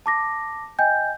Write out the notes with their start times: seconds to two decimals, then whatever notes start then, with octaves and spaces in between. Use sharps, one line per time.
0.06 A5 D6 A#6
0.79 D#5 G5 G#5 G6